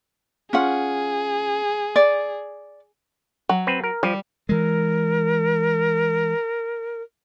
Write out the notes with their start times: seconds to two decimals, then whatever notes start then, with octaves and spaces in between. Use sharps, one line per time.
0.53 C#4 F4 G#4 F#5
1.96 D5
3.49 F#3
3.67 C4 B4
3.84 A#4
4.03 F3 G3
4.49 E3 G#3 A#4